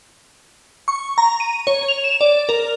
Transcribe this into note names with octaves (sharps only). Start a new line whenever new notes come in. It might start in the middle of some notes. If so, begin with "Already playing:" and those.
C#6
A#5
D#7
C#5
F7
E7
D5
A#4